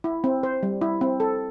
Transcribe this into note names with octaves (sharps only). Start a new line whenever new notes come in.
E4
C4
C5
G3
E4
C4
A4